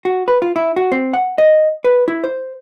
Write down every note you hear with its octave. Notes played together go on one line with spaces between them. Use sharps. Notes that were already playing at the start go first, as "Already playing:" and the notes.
F#4
B4
F4
E4
F#4
C4
F#5
D#5
B4
E4
C5